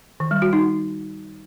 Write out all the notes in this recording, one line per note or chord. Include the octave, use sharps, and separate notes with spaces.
D#3
G3
F#4
D#4